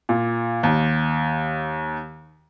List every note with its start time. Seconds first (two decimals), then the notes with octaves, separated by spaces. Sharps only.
0.09 A#2
0.63 D#2